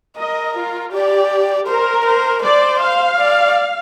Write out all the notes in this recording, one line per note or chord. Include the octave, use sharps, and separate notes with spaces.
A#4 D#5
F4
G4 D5
A#4 C5
C5
C5 D5
F5
D5